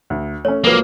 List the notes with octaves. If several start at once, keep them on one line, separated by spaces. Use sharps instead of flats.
D2
A3 C#4 C#5
C#2 F3 F#3 A#3 A4 B4